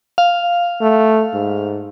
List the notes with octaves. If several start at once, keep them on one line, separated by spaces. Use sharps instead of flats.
F5
A3
G#2